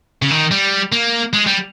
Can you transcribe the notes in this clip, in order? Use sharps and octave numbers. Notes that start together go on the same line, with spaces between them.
C#3
D#3
G3
A#3
G#3
G3